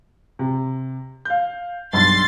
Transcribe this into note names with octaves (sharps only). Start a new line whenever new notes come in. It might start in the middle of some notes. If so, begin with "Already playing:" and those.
C3
F5 G6
B1 G2 C6 A6 C7